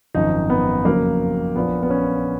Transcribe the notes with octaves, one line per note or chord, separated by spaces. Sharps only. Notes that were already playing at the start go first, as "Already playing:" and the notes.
G#1 F#2 F3 D#4
B3
F2 C#3 F#3 A#3
A#1 A#2 F3 B3
B3
C#4